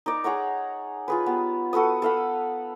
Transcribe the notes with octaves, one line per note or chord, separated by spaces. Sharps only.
D#4 A#4 D5
G#4 C#5 F#5 A#5
F4 G#4 B4
G3 B3
F#4 A4 B4 D#6
A4 F5 F#5 B5